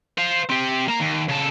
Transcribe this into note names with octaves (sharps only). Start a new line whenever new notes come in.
C5 F5
C4 G4
A#3 A#5
D#2
C#3 A4